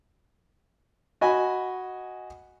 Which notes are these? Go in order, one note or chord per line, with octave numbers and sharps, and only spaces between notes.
F#4 D#5 G#5 B5